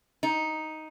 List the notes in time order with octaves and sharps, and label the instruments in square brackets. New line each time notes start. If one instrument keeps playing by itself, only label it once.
[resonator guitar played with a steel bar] D#4